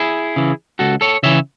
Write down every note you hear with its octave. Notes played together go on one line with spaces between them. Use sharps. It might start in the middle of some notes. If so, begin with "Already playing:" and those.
Already playing: E4 G#4
C#3 E3
C#2 F#4 A4
A4 C#5
C#3 E3 C#5 E5